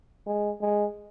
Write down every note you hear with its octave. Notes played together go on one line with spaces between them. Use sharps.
G#3
G#3